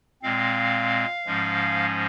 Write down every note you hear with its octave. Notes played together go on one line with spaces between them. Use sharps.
A#2 G#3 C4 F5
G#2 F3 G#3 C#4